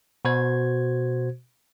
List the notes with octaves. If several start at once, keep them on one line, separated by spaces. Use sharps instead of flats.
B2 F#4 C5 G#6